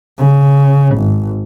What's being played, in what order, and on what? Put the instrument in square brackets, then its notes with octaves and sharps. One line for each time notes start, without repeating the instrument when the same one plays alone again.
[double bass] C#3
G#1